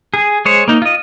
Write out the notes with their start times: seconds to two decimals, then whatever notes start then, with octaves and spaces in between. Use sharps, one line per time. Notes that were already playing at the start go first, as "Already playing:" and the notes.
0.14 G#4
0.45 G#3 G#4 C5 C#5
0.68 A#3 D#4
0.82 F4 D#5